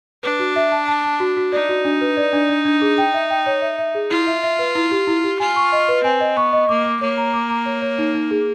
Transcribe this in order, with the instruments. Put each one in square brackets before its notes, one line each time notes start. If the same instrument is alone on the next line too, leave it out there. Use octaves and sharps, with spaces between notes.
[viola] D4 [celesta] B4
[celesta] F#4
E5
A5
A5
A5
F#4
F#4
[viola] D#4 [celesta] D5
[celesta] F#4
D4
B4
D5
D4
D4
D4
G#4
G5
E5
G5
C#5
E5
E5
G#4
[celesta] E4 [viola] F4
[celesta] E5
E5
B4
E4
G4
E4
G4
[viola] F4 [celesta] G#5
[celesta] C#6
D#5
B4
[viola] C4 [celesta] G#5
[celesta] D#5
[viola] B3 [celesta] C#6
[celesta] D#5
[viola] A#3 [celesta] D6
[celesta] D6
[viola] A#3 [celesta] C#5
[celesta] A#5
D6
A#5
C#5
C#5
D#4
D#4
G#4